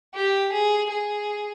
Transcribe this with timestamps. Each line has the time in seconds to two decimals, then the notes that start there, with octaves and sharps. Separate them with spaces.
0.15 G4
0.53 G#4
0.90 G#4